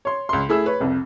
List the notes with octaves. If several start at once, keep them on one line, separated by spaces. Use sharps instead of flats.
C#5 C6
C#2 C6
A3 E4 G#4 E6
B4 C#5
C2 F2